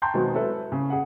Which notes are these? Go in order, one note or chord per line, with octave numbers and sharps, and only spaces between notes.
G5 A5 A#5 C6 G6
B2 D#3 F#3 G#3 B3 C4
E4 A4 B4
C#3
G#4 F#5